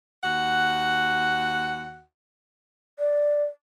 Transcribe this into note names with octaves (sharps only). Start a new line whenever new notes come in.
D#2 F#4 F#5
D5